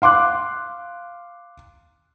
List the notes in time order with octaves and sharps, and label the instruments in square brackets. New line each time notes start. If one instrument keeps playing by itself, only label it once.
[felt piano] F5 C6 D6 F#6